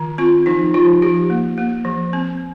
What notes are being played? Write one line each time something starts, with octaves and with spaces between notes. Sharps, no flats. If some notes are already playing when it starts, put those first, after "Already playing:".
Already playing: D#3
C4 F4
F3 D#4
F3 F4
F3 G4
A#3
A#3
F3
C4